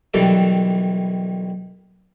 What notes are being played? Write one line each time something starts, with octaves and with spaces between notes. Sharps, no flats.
B1 D#3 E3 G3 A4 D6